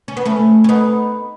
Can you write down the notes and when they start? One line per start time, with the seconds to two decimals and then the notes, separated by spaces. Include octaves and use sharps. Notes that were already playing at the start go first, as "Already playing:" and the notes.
0.08 C#4
0.17 B3
0.25 A3 C#4
0.64 C#4
0.69 B3 D#4